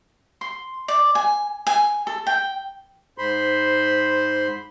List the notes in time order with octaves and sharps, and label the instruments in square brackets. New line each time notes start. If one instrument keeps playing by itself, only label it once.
[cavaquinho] C6
D5
G#5
G#5
A4
G5
[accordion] G#2 C5 B5 C6